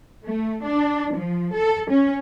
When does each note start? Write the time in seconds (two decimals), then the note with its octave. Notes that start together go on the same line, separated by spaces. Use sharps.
0.25 A3
0.65 D4
1.16 F3
1.55 A4
1.91 C#4